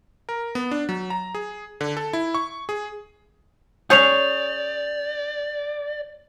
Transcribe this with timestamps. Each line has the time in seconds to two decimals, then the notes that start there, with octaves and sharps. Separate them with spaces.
0.29 A#4
0.55 B3
0.71 D4
0.89 F#3
1.10 A#5
1.35 G#4
1.81 D3
1.97 A4
2.13 E4
2.35 C#6
2.69 G#4
3.90 C#4 G#4 D5 G6 F7